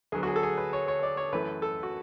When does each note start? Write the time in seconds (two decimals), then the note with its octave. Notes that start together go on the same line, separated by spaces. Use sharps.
0.12 D2 D3 F#3 B3 G#4
0.23 F#4
0.27 G#4
0.36 A4
0.43 G#4
0.58 B4
0.73 C#5
0.88 C#5
1.03 D5
1.17 C#5
1.32 F#2 E3 A3 B4
1.62 A4
1.83 F#4